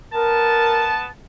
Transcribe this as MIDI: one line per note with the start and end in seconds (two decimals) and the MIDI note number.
0.13 1.06 59
0.13 0.90 70
0.13 1.06 81